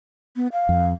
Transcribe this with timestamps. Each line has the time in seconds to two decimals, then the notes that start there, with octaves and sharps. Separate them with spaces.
0.36 B3
0.52 F5
0.69 F2